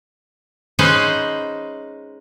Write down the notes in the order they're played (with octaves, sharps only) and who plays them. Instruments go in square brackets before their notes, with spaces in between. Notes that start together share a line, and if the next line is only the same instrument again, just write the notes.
[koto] G#3 C#4 D#4 B4 C5